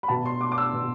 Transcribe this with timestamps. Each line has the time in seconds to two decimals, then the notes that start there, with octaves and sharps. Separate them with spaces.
0.03 B5
0.08 B2 A5
0.26 C6
0.41 D6
0.52 D6
0.58 E6
0.73 B2